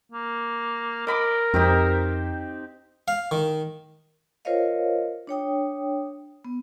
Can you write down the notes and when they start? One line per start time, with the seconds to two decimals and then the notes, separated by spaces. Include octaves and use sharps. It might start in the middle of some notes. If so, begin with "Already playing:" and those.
0.12 A#3
1.07 A#4 D#5 B5 D6
1.54 F2 C4 D#4 G4
3.08 F5
3.31 D#3
4.45 F4 A#4 C5 C#5 D#5 F5
5.27 D4 C#5 G5 D#6
6.45 B3